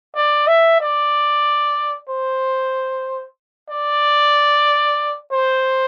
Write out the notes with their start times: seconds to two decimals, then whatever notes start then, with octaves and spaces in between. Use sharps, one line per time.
0.15 D5
0.48 E5
0.80 D5
2.09 C5
3.71 D5
5.32 C5